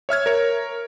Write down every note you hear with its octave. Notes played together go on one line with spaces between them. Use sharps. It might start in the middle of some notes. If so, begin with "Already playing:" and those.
C#5 E5 F6 G#6
A#4 C#5